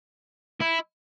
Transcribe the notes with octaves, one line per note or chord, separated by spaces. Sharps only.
E4